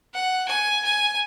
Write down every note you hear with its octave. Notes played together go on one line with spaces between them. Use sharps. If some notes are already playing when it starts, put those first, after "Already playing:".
F#5
G#5
G#5